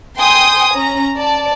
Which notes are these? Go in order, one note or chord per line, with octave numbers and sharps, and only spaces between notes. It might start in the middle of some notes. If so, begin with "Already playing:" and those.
G5 G#5 C6 D#6
C#4 A#5
D5 A5